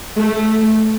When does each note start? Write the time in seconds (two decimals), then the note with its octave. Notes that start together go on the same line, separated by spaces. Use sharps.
0.19 A3